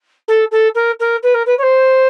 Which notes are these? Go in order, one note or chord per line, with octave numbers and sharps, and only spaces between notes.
A4
A4
A#4
A#4
B4
A#4
B4
C#5
C5